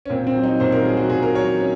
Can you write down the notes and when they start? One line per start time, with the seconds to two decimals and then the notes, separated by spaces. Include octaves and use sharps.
0.06 C#4
0.10 A#2 C4
0.27 C4
0.36 F#3
0.44 D#4
0.60 A#2 C5
0.72 A#4
0.85 F#3 G#4
0.97 F#4
1.10 A#2 G#4
1.23 A#4
1.35 F#3 C#5
1.60 C#4